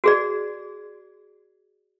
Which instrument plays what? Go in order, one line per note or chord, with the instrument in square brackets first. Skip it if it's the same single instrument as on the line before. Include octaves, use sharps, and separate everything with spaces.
[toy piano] F#4 G#4 D5